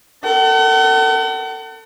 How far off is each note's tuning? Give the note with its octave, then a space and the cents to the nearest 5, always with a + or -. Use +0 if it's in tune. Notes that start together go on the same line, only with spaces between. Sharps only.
A4 +30 F#5 +40